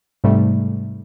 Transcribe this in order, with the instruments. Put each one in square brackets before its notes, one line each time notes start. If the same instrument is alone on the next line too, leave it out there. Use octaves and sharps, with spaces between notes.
[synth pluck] G#2 C3 G3 A3